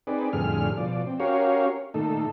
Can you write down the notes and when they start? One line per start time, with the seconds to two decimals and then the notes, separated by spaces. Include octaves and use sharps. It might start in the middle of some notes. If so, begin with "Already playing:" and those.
0.07 C4 D#4 G#4 B4 D5
0.33 F2 A2 D3 G3 G#4 F6
0.77 B2 F3 D5
1.07 C4
1.20 C#4 F#4 G4 A#4 C#5 F5
1.94 A#2 D#3 A3 D#4 A4